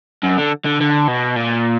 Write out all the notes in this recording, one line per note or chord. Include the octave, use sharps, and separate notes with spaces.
F#2
D3
D3
D3
B2
A#2